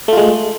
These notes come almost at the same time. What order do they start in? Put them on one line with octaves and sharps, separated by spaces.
A3 F4 G#3